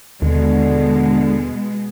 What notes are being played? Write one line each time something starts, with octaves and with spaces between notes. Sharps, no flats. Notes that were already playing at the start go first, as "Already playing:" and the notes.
D#2 B2 D3 G#3